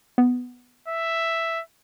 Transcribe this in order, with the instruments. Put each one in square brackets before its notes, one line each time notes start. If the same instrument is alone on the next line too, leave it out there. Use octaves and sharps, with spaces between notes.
[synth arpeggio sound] B3
[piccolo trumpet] E5